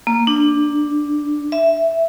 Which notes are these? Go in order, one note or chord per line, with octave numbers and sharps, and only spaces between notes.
A#3
D4
E5